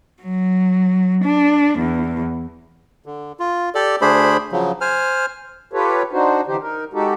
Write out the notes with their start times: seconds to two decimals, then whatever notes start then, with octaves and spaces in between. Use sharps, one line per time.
0.23 F#3
1.24 D4
1.79 E2
3.06 D3
3.39 F4
3.75 G4 A4 D5
4.01 D2 A3 D4 G#4 C5 B5
4.52 C#3 F3 F#3
4.81 C5 G#5 F6
5.73 F4 G4 A4 B4 C#5
6.12 D4 D#4 F#4 C5
6.47 D3 E3 D#4 G4 C5
6.61 D#4 A#4
6.93 G#3 D#4 F#4 G4 A4